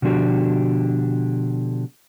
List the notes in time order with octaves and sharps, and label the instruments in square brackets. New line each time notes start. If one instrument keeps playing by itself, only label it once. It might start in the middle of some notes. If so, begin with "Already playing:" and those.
[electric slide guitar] B2 D3 F3 D4 F#4 G4